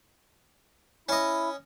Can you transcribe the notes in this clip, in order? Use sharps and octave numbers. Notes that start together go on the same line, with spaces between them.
C#4 E4 D#5